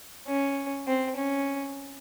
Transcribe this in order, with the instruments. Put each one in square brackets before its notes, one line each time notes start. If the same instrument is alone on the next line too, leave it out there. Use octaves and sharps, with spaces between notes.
[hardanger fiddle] C#4
C4
C#4